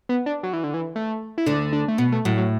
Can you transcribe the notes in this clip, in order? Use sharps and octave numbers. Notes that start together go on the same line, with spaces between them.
B3
D4
F#3
E3
D3
E3
A3
E4
D2 D3 D4
D4
A3
B2 B3
A3
A2 F#3
F#3